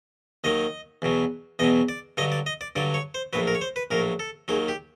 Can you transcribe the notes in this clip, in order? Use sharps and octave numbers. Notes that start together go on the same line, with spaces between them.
D#2 D#3 F#3 D#5
E2 B2 F#3
E2 B2 F#3 D#5
D5
G2 D3 F#3 D#5
D5
D#5
D5
G2 D3 F#3 D5
C#5
C5
A#1 A2 F#3 B4
A#4
C#5
C5
B4
A#1 A2 F#3 A#4
A4
D#2 D#3 F#3 G#4
G4